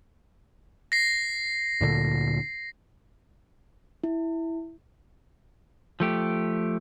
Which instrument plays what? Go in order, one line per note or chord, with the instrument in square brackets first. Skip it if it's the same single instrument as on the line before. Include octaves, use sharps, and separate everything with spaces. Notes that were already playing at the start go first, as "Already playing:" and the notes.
[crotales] A#6 C7
[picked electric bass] D2 A#2 D3
[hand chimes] E4
[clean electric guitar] F3 A3 G4